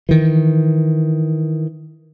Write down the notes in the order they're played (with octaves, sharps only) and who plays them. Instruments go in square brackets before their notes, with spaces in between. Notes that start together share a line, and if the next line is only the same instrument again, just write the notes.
[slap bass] D#3 E3